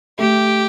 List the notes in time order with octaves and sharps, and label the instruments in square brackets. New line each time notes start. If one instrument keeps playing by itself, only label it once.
[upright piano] A3 [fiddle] G4